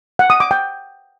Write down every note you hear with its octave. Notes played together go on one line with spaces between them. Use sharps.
F#5
D#6
D6
G5